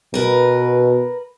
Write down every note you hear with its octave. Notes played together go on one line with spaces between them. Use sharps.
B2 A#4 B4